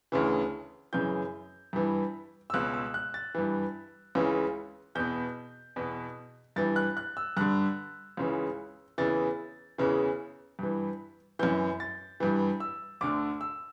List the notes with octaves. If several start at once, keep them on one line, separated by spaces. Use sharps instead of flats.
D2 C#3 E3
F#2 C#3 E3 G6
G2 E3
E6
C#2 B2 F#6
E6
F#6
A6
G2 E3
C#2 C#3 E3
E2 B2 G6
E2 B2
G2 E3 A6
F#6
F#6
E6
G2 D3 F#6
C#2 C#3 E3
E2 C#3 E3 A6
E2 C#3 E3
G2 E3
F#2 E3 G6
A6
G2 E3
E6
D2 D3 D6
E6